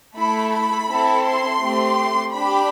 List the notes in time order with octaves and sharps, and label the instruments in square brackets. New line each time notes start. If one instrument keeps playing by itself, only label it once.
[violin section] A3 E4 A4 B5
B5
C4 E4 A4
C6
A3 C4 G4
D4 G4 B5